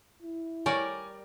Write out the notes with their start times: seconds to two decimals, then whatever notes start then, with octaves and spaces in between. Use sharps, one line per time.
0.22 E4
0.66 G3 A#4 C#5 D5 G#5